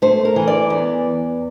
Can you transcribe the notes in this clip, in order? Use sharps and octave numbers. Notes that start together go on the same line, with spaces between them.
A3 C5
A#4
E3
D5
E2